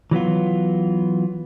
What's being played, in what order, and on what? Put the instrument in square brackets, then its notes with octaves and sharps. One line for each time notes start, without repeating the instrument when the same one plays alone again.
[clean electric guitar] E3 F#3 B3 F4